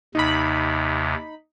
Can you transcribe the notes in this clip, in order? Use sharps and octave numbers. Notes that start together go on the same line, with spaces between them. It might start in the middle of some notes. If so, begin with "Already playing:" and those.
D#2 C3 D#4 B5